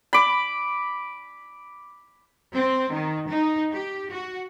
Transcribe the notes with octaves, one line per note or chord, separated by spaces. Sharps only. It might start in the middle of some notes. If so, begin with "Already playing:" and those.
B5 D6
C4
D#3
D#4
G4
F#4